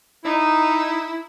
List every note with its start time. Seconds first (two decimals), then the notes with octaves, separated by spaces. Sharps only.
0.24 D#4 E4